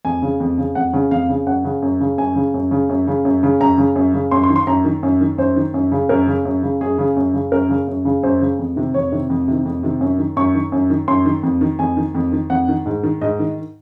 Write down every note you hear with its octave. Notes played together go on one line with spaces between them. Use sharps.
F2 G#5
C#3
F2
C#3
F2 F#5
C#3
F2 F5
C#3
F#2 F#5
C#3
F#2
C#3
F#2 G#5
C#3
F#2
C#3
F#2
C#3
F#2
C#3
F#2 A#5
C#3
F#2
C#3
F#2 C6
C6
D#3
C6
F#2 A#5
D#3
F#2
D#3
F#2 C5
D#3
F#2
C#3
F#2 A#4
C#3
F#2
C#3
F#2 G#4
C#3
F#2
C#3
F#2 A#4
C#3
F#2
C#3
F#2 C5
C#3
F2
C3 D#3
F2 C#5
C3 D#3
F2
C3 D#3
F2
C3 D#3
F#2
D#3
F#2 C#6
D#3
F#2
D#3
F#2 C6
D#3
F2
D#3
F2 G#5
D#3
F2
D#3
F2 F#5
D#3
G#2
D#3
G#2 D#5
D#3